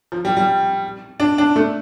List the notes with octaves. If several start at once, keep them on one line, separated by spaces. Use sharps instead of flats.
F3
G3
G3
D4
D4
A3